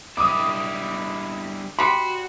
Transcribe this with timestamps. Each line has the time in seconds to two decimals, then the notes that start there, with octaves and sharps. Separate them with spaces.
0.17 D3 G3 E4 D6 D#6
1.79 G3 F#4 B5 C6